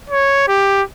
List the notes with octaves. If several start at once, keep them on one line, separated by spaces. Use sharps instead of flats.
C#5
G4